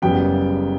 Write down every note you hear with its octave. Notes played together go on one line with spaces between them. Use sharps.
F#1 F#2 C#3 G3 B3 G5